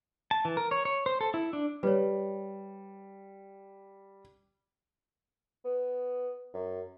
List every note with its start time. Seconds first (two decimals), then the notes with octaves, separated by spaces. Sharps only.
0.31 A5
0.45 E3
0.57 A#4
0.71 C#5
0.85 C#5
1.06 C5
1.21 A4
1.34 E4
1.53 D4
1.83 G3 B4 C#5
5.65 B3
6.54 F#2